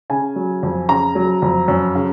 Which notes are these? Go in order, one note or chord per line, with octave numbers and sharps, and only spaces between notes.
C#3 G#5
F#3
F2
C#3 A#5
F#3
F2
F#2
C#3